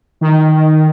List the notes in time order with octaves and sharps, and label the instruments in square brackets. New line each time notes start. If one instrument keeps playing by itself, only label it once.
[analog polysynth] D#3